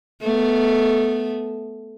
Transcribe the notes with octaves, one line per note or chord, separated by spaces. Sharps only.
A3 B3